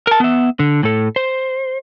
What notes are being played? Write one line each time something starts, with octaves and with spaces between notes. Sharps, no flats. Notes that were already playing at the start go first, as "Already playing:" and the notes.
A#4 A5
B3 E5
D3
A2 A4
C5